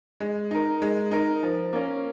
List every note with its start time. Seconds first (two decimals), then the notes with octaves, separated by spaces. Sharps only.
0.20 G#3
0.51 D#4 A#4
0.82 G#3
1.11 D#4 A#4
1.43 F3
1.73 A#3 C#4